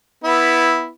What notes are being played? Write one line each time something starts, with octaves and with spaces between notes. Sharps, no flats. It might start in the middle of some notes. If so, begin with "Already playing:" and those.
B3 E4